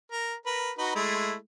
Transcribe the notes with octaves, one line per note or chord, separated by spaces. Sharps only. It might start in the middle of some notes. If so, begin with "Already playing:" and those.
A#4
A#4 B4
D#4 F#4 B4
G#3 A3 E4